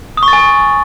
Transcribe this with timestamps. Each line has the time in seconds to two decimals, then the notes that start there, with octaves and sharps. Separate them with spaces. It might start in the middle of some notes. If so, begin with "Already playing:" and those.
0.17 D#6
0.23 C#6
0.28 A6
0.33 G#5